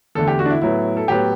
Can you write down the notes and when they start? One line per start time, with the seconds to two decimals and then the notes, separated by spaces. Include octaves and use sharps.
0.15 E2 D3 A3 A4
0.28 G4
0.39 F#4
0.46 D4
0.50 E4
0.62 A2 F#3 B3 E4
0.97 A4
1.08 A2 F#3 B3 G4